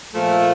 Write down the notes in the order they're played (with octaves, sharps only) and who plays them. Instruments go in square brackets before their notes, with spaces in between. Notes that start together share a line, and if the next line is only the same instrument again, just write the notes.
[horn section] A#2 F3 A3